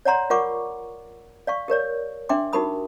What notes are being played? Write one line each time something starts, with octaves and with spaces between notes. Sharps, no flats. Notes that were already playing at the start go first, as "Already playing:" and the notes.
C#5 D5 F#5 A#5 C6
F4 A#4 D5 F#5 C#6 D6
D5 F5 C#6
G4 A#4 C#5 D5
D4 E5 G5 C6 D6
D#4 F#4 G4 A#4 B5 D#6